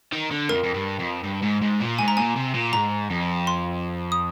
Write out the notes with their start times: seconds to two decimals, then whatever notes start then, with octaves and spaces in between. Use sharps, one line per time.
0.13 D#3
0.31 D3
0.49 F2 A#4
0.64 F2
0.74 G2
1.00 F2
1.24 G2
1.42 G#2
1.61 G#2
1.80 A#2
1.99 G#2 G#5
2.08 A#5
2.17 A#2 G#5
2.36 C3
2.54 A#2
2.73 G#2 A#5
3.10 F2
3.47 C6
4.12 D#6